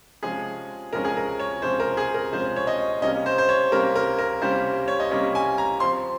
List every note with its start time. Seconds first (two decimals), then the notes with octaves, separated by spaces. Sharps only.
0.23 C3 F3 G#3 C#4 G#4
0.93 C3 F3 G#3 C#4 A#4
1.05 G#4
1.17 A#4
1.39 C#5
1.62 C3 F3 G#3 C#4 C5
1.80 A#4
1.97 G#4
2.14 A#4
2.32 C3 F3 G#3 C#4 C5
2.56 C#5
2.67 D#5
3.02 C3 G3 A#3 C#4 D#5
3.26 C5
3.38 C5
3.49 C#5
3.72 C3 G3 A#3 C#4 A#4
3.96 A#4
4.18 A#4
4.41 C3 G3 A#3 C#4 C5
4.88 C#5
5.00 D#5
5.11 C3 G3 A#3 C#4 C#5
5.35 G#5
5.58 A#5
5.80 F3 C4 C6